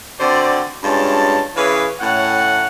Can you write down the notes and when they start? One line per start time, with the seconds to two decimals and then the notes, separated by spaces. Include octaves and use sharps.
0.20 D3 C4 F#4 C5 D5
0.83 G2 G#3 C#4 F4 A5
1.56 E3 C#4 G#4 B4 C#5 F5
2.01 A2 C#4 F#5